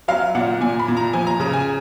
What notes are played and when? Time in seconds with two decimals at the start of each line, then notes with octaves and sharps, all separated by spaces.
0.08 F#3 F5
0.35 A#2 F#5
0.61 A#2 G#5
0.79 B5
0.88 A#2
0.97 A#5
1.13 F3 G#5
1.27 A#5
1.40 C#3 A#5
1.53 G#5